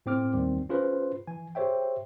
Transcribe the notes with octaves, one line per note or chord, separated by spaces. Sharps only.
A2 C4 D6 F6
D#2 D#3 G3 C4
C#4 F4 G#4 B4 C5
E3 G#5
G4 G#4 C5 C#5 E5 G5